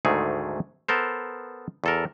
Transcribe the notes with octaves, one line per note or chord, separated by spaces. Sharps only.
D2 G#2 D#3 A3 G#4
B3 A4 A#4 C5
E2 A4 A#4